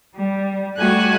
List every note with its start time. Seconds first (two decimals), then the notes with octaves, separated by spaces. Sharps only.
0.15 G3
0.78 G3 A3 F#4 G#5 F#6